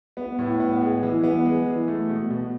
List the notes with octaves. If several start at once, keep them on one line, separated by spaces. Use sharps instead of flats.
B3
A2
B3
G#3
E3
B3
G#3
E3
A3
B2
B2